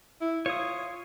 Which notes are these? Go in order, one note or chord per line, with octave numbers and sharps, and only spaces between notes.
E4
F4 C#5 D#6